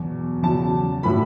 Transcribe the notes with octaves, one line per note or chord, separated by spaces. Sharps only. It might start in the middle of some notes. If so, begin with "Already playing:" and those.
Already playing: E2 B2 F#3
E2 C#3 F#3 A5
A2 F#3 B5